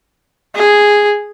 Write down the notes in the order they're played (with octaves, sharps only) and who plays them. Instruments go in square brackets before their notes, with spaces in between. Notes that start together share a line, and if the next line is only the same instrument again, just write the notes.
[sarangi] G#4